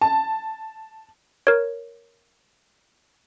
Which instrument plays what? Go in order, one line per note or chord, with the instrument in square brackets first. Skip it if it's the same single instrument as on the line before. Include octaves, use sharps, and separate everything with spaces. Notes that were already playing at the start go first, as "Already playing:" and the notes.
[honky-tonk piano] A5
[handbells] A#4 C#5